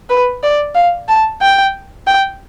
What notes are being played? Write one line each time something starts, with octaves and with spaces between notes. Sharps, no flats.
B4
D5
F5
A5
G5
G5